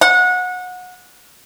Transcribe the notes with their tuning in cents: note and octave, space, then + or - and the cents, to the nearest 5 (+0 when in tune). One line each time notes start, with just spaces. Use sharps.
F#5 -25